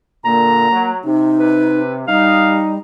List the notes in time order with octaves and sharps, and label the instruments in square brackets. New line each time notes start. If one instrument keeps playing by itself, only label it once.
[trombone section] A#2 D3 [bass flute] A#3 [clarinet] A#5
[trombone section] F#3
[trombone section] C3 [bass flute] D#4
[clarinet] B4
[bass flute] G3 [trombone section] D#4 [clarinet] F5